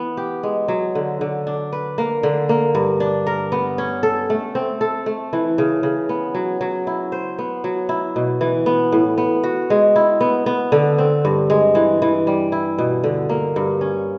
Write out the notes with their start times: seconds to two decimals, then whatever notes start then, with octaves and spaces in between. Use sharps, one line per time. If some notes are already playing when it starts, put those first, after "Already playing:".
Already playing: E3 B3
0.17 G4
0.43 G#3
0.68 F#3
0.95 D3
1.21 D3
1.47 D4
1.73 B4
1.98 A#3
2.23 D3
2.49 A#3
2.75 G2
3.00 D4
3.27 A#4
3.52 B3
3.78 C#4
4.03 A4
4.30 A3
4.55 C4
4.81 A4
5.06 A3
5.33 E3
5.58 C#3
5.83 C#3
6.09 B3
6.35 F#3
6.61 F#3
6.87 E4
7.12 C5
7.39 B3
7.64 F#3
7.89 E4
8.16 B2
8.41 E3
8.66 B3
8.92 A2
9.18 B3
9.44 F#4
9.70 G#3
9.96 E4
10.21 B3
10.46 B3
10.72 D3
10.98 C4
11.25 G2
11.50 G#3
11.75 E3
12.02 E3
12.27 G3
12.52 E4
12.78 B2
13.04 D3
13.29 A#3
13.56 G2
13.81 C#4